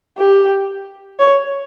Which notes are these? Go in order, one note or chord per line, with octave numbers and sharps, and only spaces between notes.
G4
C#5